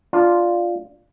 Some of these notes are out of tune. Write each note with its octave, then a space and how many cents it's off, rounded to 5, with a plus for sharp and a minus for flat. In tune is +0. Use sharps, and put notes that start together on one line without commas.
D4 +0 F4 +0